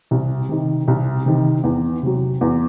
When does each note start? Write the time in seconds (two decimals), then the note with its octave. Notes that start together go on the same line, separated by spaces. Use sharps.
0.11 C2
0.49 C3 D#3
0.88 C2
1.26 C3 D#3
1.64 E2
2.03 C3 F#3
2.41 E2